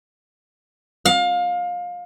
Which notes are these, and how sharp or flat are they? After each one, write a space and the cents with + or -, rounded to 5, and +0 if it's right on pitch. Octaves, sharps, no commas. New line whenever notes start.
F5 +25